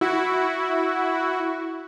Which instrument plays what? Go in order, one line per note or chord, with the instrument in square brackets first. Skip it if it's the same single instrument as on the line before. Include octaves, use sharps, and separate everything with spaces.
[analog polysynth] E4 F#4